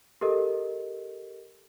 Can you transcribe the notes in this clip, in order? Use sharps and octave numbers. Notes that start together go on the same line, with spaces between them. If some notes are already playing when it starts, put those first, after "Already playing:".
G4 A4 A#4 D#5